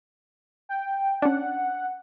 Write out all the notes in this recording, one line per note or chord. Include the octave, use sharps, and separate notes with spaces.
G5
C#4 D4 F#5